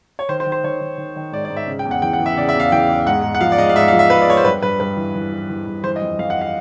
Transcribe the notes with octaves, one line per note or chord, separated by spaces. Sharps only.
C#5
D#3 C5
C5
D#3
C5
D#3 C#5
D#3
D#3
D#3
G#2 D5
D5
G#2
E5
C#3
G5
E2
F#5
E3 G5
F#5
E3
E5
C#3 D5
E5
E2 F5
E3 G5
E2
G#2 F#5
G#2
F#5
F3 F5
D5
G#2 D#5
F5
G#2 E5
F5
F3
E5
G#2 B4
D5
G#2 C#5
C5
G2 B4
G2 B4
G2 B4
E3
E3
E3
E3
G2
E3 C5
D#5
F2
F2 F5
F#5
F5